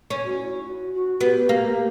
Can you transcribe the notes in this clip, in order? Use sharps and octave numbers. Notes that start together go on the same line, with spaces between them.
C#4
F#4
E4
E4
F#4
F#4
B3 G4
A#3